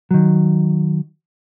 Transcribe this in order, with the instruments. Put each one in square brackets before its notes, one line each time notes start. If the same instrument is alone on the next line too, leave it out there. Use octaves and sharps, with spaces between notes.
[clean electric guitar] D#3 F#3